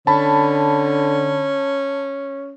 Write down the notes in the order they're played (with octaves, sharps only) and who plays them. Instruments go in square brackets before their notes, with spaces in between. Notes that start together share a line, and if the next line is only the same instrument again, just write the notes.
[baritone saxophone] D3 [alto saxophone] C#4 [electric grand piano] A5 B5